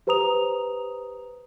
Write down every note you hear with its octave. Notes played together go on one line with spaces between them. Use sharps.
G4 B4 C5 A#5 D#6 F7